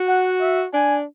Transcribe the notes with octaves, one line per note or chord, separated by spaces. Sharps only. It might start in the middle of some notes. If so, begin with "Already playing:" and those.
Already playing: F#4
F#5
E5
D4 G#5